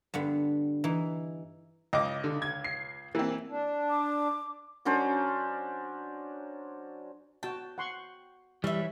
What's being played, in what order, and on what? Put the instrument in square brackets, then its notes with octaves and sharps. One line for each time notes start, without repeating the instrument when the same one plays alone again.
[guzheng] G2 D3 B3 B5
E3 D#4
[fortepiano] C#2 D6 [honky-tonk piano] D#5
[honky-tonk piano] D3
G#6
C7
[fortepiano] E3 [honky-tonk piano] A#3 C4
[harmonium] D4
[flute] D6
[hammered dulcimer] F#3 C#4 D4 C5
[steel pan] F#4 A5 [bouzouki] G5
[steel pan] F#5 C6 C#6
[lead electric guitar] E3 [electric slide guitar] G3 [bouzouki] C#5 E5